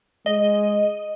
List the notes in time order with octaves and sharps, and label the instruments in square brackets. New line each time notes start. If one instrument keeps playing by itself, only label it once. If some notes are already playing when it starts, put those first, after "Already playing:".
[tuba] G#3 [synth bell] D#5